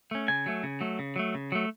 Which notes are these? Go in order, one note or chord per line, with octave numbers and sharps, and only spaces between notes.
A3 C#4
C#3 G#5
F#3 A3
C#3
F#3 A3
C#3
F#3 A3
C#3
F#3 A3